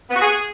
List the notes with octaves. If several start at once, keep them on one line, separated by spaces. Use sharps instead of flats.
B3
F#4
G#4